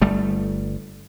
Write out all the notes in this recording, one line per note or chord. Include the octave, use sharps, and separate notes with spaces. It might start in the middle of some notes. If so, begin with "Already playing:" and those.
G1 G3 A3